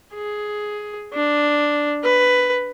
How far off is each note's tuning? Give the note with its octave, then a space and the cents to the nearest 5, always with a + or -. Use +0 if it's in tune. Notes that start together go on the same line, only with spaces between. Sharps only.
G#4 +10
D4 +0
B4 +10